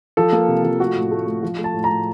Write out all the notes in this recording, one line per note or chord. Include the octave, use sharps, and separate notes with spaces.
F3 A4
A#3
C3
F3
A3 F#4
A2
A3
A3
F3
A3
A5
A2
A#5
A2